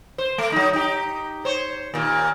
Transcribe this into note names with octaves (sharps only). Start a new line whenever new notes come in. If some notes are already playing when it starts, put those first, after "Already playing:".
C5
A3
F#3 D#4
D#4 G4
C5 C#5
D#2 A#2